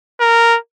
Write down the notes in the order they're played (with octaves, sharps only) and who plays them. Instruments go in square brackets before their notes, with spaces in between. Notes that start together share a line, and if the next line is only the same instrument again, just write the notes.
[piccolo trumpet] A#4